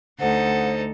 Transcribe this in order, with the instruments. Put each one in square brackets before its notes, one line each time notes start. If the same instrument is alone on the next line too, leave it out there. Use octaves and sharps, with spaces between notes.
[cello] D2 [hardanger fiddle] D#4 A4 [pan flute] C5 [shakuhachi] F#5